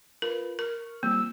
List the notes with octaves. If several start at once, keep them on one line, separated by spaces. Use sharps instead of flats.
F4 A#4 B4
A#4 C#6 F6
F3 G3 A#3 C4 E6